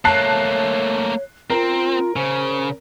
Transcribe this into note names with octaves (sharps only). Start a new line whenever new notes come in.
A3 A#3 C#5 A5 F#6 C7
C4 F4 A#4
C#3 C5